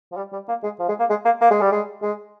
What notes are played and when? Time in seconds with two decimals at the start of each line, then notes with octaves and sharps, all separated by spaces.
0.12 F3
0.17 G3
0.33 G3
0.48 A#3
0.63 G#3
0.79 F3
0.89 G#3
0.99 A#3
1.10 G#3
1.25 A#3
1.41 A#3
1.51 G#3
1.61 G3
1.72 G#3
2.02 G#3